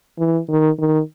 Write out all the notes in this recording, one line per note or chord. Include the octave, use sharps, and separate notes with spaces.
E3
D#3
D#3